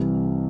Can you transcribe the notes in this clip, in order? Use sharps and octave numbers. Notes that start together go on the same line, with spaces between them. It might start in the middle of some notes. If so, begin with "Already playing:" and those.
Already playing: C2 C3 E3 G3